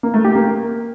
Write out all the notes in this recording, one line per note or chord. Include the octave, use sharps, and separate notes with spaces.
A#3
A3
G4
A#3